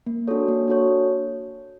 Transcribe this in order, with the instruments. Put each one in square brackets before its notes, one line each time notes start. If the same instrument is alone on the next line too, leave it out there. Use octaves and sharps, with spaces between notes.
[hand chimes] A#3
D4 F#4 A4 C#5
A#3
D4 F#4 A4 C#5